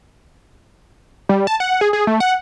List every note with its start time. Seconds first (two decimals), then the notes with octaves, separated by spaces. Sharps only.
1.29 G3
1.47 A5
1.60 F#5
1.81 G#4
1.93 G#4
2.07 A3
2.20 F#5